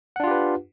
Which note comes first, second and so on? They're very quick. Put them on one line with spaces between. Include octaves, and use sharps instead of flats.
F#5 D4 F4 G4 B4